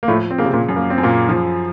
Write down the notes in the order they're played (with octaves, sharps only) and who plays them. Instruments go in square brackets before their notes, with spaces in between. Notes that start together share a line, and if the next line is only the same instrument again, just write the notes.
[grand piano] A#3
[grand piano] A2 A3 [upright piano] F3
[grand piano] C4
[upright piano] C#3 [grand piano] A#3
[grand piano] C3 C4
A#2 A#3
[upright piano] F#2
[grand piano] A#3
C4
[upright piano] F#2
[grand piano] A#2 A#3
[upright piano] F3